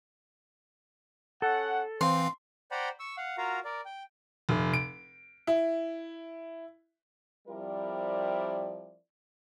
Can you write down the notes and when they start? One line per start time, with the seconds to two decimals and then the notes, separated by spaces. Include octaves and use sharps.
1.42 C#4 A4 F#5
2.01 E3 C4 C5 F5 C6
2.71 C5 D5 F#5 G5 A#5 B5
3.00 C#6 E6
3.17 F5 F#5
3.38 F4 F#4 A#4 F5 A#5
3.65 A#4 D5
3.85 G5
4.49 F1
4.74 D7
5.47 E4
7.48 F3 G3 C4 E4 A#4 D5